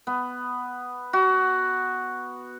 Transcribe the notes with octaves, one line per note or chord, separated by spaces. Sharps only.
B3
F#4